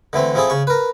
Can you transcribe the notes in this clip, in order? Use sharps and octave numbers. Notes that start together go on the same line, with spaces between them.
D3 E3 A3 C4
F3 C4 E4 G#4 A4
C#3 C#6
A#4 B4